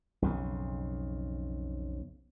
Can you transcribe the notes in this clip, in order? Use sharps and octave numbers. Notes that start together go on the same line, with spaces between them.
B1 F2 C#3